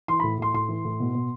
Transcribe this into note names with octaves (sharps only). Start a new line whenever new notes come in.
E3 C6
A2 B5
A2 C6
A2 C6
E3
A2
B2
B2